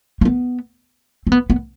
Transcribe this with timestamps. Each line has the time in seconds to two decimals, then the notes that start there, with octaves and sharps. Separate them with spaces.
0.21 A#3
0.25 B3
1.27 C4
1.32 B3
1.50 B3